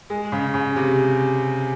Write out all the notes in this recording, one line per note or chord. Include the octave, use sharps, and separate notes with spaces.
G#3
C#3
C#3
C3